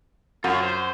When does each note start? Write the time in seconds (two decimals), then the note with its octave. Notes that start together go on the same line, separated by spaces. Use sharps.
0.44 F#2 F4 C#5
0.63 C5